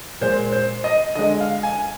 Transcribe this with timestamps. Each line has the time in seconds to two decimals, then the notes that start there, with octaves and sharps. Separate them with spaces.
0.21 A#2 G#3 C5
0.52 C5
0.84 D#5
1.15 D3 G#3 D#5
1.40 F5
1.63 G#5